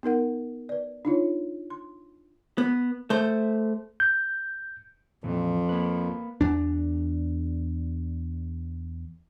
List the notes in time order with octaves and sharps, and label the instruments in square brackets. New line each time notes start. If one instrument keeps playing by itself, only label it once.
[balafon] B3 D#4 A#4 F#5
B4 D5
D4 D#4 F4 C#5
C6
[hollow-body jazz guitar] B3
A3 C5
[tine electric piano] G6
[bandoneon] F2 [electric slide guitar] A#2 E3
[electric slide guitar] A#3 B4
[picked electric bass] E2 D4